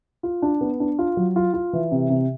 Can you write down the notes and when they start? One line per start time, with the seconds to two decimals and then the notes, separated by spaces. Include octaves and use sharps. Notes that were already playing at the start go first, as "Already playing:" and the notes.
0.23 F4
0.42 D4
0.61 B3
0.80 D4
0.99 F4
1.17 F#3
1.36 F4
1.54 F4
1.73 E3
1.92 C3
2.10 C3